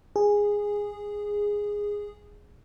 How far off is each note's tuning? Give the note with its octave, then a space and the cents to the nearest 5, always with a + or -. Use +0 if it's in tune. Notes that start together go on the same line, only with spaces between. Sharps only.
G#4 -10